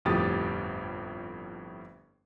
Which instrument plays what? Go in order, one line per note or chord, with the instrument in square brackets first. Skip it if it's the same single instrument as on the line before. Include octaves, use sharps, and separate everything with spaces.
[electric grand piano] G1 F2 A2 G4 D#6 A6